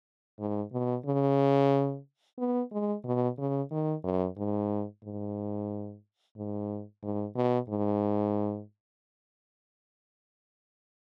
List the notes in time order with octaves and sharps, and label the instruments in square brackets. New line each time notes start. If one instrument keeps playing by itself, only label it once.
[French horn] G#2
B2
C#3
B3
G#3
B2
C#3
D#3
F#2
G#2
G#2
G#2
G#2
B2
G#2